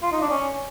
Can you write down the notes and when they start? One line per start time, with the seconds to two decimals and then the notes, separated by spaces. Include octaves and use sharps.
0.03 F4
0.12 D#4
0.21 D4
0.30 C#4